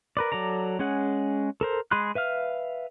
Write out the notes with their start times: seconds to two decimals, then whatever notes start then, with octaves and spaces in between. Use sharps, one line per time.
0.17 A#4 B4 D5
0.32 F#3 A4 D5 A#5
0.79 G#3 C#4 G#4 F#5
1.61 A4 A#4 C5
1.91 G#3 G#4 B5 C6 F#6
2.15 B4 E5 F5 F6